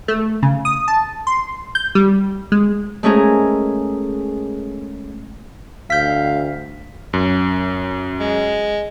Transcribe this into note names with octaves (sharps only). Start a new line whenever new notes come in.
A3
C#3
D#6
A5
C6
G6
G3
G#3
G#3 A3 C#4 G#4 A#4
D2 F5 G6 B6
F#2
G#3